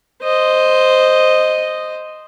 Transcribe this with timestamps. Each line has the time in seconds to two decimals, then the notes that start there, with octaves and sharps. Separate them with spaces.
0.22 C5 D#5